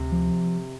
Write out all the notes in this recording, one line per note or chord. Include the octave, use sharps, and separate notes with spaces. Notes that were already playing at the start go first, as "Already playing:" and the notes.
Already playing: D2 C3
F3